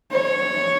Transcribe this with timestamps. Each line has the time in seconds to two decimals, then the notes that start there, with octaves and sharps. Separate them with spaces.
0.12 C#5